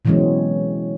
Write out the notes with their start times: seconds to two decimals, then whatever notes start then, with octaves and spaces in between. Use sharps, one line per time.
0.05 B2 E3 F#3 G#3 C4 C#4